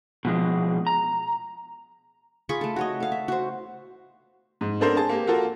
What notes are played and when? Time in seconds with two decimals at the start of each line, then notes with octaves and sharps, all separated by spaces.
0.25 B2 F3 G#3
0.87 A#5
2.49 F4 G#4 B5 C#6
2.61 A3 A4
2.76 F#4 C#5 D#5
3.00 A4 F5
3.12 E5
3.28 F#4 C5
4.61 G#2
4.80 B3 C4 D4 A4 A#4 C5
4.96 G#4 A5
5.09 A#3 G4
5.27 A#3 F4 F#4 A4 A#4